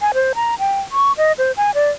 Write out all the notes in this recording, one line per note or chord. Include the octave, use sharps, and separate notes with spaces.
G#5
C5
A#5
G5
C#6
D#5
C5
G#5
D5